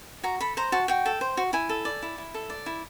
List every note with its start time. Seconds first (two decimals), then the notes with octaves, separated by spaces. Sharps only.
0.23 F#4 A#5
0.41 A4 B5
0.57 C5 A#5
0.72 F#4 A5
0.88 F#4 G5
1.06 A4
1.21 C5
1.37 F#4
1.53 E4 G#5
1.69 A4
1.85 D5
2.02 E4
2.18 E4
2.34 A4
2.50 D5
2.66 E4